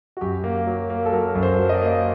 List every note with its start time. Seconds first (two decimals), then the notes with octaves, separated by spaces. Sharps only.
0.17 F#4
0.21 F#2 G4
0.44 A#3
0.67 F#3
0.90 A#3
1.06 A4
1.12 F#3 A#4
1.35 F#2
1.43 C5
1.59 F#3
1.69 D#5
1.74 D5
1.82 A#3